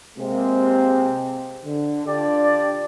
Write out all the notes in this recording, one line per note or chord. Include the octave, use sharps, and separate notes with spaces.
C3 G#3 A#3 C4
D3
D3 D4 F4 G4 D5